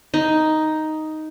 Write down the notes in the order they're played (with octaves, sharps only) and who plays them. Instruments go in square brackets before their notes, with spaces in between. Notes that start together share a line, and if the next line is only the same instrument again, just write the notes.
[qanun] D#4